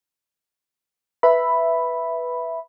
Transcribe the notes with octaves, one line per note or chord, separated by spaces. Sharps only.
B4 E5 B5